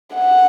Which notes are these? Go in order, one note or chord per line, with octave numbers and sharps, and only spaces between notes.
F#5